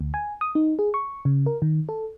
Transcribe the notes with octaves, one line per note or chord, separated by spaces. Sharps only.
D2
G#5
D#6
D#4
G#4
C#6
C#3
A#4
D#3
A4